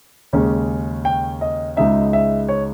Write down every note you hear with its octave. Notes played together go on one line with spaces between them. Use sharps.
D#2 C#3 G#3 C#4
G5
D#5
C#2 C#3 G#3 D#4 E5
E5
C#5